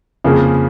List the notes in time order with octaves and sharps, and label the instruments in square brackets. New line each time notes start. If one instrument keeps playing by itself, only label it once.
[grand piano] F2 C#3 F3 A#3 [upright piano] G#4